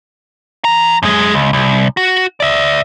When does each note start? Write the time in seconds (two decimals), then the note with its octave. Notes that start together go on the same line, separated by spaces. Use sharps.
0.65 E3 A#5
1.03 F#2 G#3
1.34 C#2
1.53 C2
1.97 F#4
2.40 D5 E5